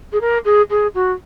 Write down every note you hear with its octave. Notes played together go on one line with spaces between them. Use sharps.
G#4
A#4
G#4
G#4
F#4